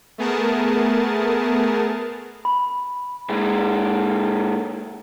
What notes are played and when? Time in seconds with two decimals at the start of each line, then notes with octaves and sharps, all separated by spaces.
0.18 A3 B3 G#4 A#4 A5
2.45 B5
3.29 A#2 G#3